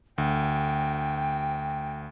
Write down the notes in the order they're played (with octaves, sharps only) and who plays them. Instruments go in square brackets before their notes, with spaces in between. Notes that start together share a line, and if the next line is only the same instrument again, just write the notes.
[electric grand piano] D2 [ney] G5